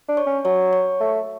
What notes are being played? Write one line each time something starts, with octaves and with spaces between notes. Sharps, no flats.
D4
C#5 C#6
C#4
F#3 C#5 C#6
C#5 C#6
A3